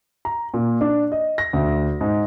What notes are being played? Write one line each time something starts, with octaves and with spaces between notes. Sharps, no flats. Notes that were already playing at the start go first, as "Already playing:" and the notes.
A#5
A#2
D4
D#5
A#6
D2
G#2